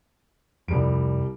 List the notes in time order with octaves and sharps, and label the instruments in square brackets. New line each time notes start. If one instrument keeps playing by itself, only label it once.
[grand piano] C2 G3 D7 [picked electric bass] F2